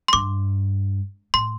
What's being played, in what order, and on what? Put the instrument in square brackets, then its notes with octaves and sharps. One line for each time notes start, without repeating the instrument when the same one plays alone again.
[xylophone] C6
[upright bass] G2 [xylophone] D6
[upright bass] A2 [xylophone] C6